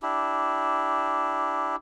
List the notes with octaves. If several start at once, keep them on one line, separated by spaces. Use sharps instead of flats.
D4 E4 G4